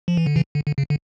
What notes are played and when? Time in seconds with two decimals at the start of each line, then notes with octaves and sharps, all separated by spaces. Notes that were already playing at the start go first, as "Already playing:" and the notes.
0.08 F3
0.17 E3
0.26 D3
0.36 C#3 E3
0.55 D3
0.67 D3
0.78 C#3
0.90 D3